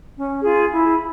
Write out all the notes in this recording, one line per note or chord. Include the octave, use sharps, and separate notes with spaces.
C#4
F4 G#4
E4